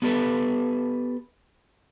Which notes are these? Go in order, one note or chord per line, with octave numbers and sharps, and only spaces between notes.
B3 G4 A4 B4